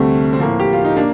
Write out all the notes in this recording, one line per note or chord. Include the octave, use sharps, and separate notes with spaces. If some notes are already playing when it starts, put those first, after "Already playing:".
Already playing: D2 C3 G3 A3 C4
C4
A2 F3 A#3
G4
F4
D#4
A#3 D4